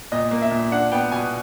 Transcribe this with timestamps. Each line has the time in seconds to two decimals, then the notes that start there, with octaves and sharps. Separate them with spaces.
0.12 A#2 D#5
0.31 A#3
0.42 E5
0.51 A#2
0.71 D4 F#5
0.92 B3 G5
1.12 B2 G#5